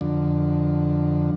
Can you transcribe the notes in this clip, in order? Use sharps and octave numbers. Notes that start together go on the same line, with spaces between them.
F2 D3